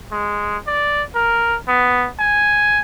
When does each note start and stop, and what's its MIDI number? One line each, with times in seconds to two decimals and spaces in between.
0.12 0.57 56
0.67 1.03 74
1.15 1.56 70
1.68 2.08 59
2.19 2.82 80